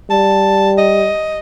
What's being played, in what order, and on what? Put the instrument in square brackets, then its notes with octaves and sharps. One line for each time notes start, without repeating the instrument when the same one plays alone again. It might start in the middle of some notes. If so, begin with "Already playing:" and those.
[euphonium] G3 [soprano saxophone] A5
[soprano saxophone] D#5